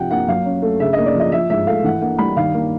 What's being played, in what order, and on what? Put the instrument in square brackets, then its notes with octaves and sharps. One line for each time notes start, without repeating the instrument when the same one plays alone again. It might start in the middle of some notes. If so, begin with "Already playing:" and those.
Already playing: [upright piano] C3 F3 F#5 G5
A#3 F#5
F#3 F5
C#4
A3
C#3 E5
A#3 D#5
D5
F3 D#5
F3 E5
G#2 E5
A3 F5
E3 F#5
A#3 F#5
G3 B5
D#3 F5
A#3